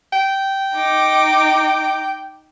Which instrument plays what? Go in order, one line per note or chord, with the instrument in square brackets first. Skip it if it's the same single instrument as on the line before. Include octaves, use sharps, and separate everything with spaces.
[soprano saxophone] G5
[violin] D#4 D6